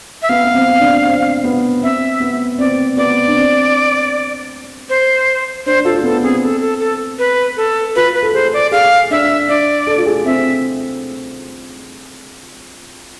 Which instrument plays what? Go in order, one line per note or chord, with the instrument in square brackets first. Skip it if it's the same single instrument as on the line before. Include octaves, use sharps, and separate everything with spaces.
[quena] E5
[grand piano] B3 [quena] F5
[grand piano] B3
C4
D4
C4
B3
[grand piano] C4 [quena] E5
[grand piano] B3
[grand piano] C4 [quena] D5
[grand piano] B3 [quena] D5
[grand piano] D4
C4
[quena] C5
[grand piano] D4 [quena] C5
[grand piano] F4 [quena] A4
[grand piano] B3 [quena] A4
[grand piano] C4 [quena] G#4
[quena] A4
A4
A4
B4
A4
[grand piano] F4 [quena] B4
[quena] B4
[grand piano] A4
[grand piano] G#4 [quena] C5
[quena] D5
[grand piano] G#4 [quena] F5
[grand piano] D4 [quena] E5
[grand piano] D4 [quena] D5
[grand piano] A4
F4
G#4
[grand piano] C4 [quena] E5